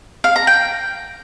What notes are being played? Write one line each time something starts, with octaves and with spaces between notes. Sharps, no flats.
F5
A#5
G5